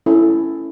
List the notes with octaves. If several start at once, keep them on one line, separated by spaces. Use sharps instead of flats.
C#4 E4 A4